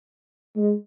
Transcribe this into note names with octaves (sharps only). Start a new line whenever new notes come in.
G#3